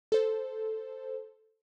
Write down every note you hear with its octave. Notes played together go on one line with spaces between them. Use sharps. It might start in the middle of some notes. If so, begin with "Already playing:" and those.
A4 C5